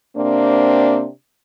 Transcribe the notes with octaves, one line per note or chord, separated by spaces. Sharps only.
C3 A#3 C4 D4